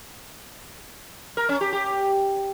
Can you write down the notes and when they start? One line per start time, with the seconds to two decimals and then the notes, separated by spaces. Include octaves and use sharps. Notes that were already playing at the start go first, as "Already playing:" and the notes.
1.37 A#4
1.49 C#4
1.61 G4
1.73 G4